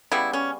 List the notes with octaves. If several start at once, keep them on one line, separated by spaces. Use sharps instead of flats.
C#3 G3 B3 E4
C#4